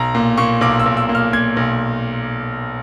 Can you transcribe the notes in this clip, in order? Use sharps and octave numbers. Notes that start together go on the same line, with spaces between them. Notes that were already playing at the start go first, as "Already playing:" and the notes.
Already playing: B1 A#5
A#2
A#2 C#6
B1 D6
E6
B1
E6
A#2
F6
A#2 G#6
B1